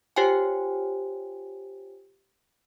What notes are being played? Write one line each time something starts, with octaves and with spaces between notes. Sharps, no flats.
F4 G4 C5 C#5 G5 G#5